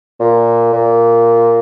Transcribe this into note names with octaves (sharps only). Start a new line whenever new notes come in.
A#2
A#2